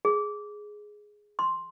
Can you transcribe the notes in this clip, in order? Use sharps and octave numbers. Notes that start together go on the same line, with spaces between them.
G#4
C6